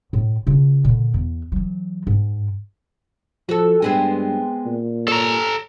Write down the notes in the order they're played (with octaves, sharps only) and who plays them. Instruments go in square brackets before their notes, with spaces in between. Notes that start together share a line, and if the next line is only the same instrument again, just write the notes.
[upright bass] A2
C#3 F4
A#2 D3
E2
E3 F#3
G#2
[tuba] F3 [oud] F#4 A4
[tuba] G2 [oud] G#3 B3 C4
[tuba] A#2
[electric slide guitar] A4 A#5 [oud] C#5